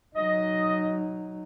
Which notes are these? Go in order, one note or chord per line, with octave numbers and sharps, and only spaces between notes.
F#3 D#4 D#5